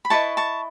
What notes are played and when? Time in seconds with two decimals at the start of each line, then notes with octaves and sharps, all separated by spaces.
0.05 B5
0.10 E4 B4 D#5 A5 C#6
0.37 A5 C#6